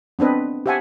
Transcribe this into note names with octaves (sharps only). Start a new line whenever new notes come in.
B3 C4 D4 B4 D#5
G4 C5 E5 F#5 G#5 A5